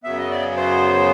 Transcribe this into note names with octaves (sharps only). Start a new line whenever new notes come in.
F#2 C#3 F#3 B3 E5
D#5
D5
C5